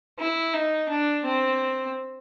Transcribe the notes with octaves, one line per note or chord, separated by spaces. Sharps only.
E4
D#4
D4
C4